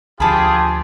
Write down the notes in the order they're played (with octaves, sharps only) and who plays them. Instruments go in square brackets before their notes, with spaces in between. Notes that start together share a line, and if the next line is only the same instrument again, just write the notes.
[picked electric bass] D2 F3 [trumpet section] F4 G4 G#4 [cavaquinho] A5 B5